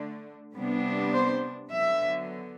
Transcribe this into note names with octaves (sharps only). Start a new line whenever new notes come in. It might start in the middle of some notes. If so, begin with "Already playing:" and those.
Already playing: D3 A3 D4
C3 G3 B3 D4
C5
D3 F#3 B3 E5